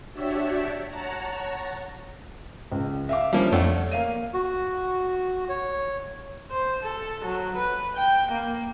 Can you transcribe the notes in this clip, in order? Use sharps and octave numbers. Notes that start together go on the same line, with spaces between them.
D4 F#4 G4 C#5 D5 E5
C#5 F#5 A5 A#5
C#2
E5 F5 D6
F3 G3 A#3 C#4 D4
F2 A3 C#5 D5 F#5
A#3 F5 D#7
F#4
C#5
C5
A4
F#3
B4
G5
A#3